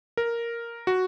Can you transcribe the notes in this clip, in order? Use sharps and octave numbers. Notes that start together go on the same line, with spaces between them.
A#4
F#4